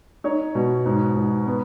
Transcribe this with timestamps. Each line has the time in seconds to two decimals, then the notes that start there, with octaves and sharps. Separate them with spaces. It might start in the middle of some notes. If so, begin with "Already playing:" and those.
0.24 D#4 C#5
0.55 B2
0.86 G#2
1.16 G#2
1.46 B3